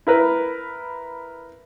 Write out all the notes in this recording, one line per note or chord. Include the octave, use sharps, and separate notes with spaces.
E4 A#4 B4